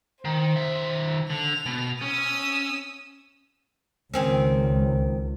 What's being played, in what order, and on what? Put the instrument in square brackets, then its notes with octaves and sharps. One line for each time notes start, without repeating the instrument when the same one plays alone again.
[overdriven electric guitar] D#3 [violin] C5
[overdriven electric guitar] D#3 E5
[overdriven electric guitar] D3 [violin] F7
[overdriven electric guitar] B2
[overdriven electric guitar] C#4 [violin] D#6 E6
[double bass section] C#2 [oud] D#3 C4 C#4